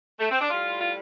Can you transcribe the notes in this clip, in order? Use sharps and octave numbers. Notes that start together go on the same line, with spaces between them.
A3
C4
D4
A2 G3 F4
F4